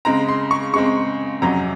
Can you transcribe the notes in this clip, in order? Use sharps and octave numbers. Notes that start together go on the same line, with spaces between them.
C#3 G#3 C4 A#5
C6
C#6
C#3 G#3 C4 C#6
F2 C3 F#3 C#4 A#5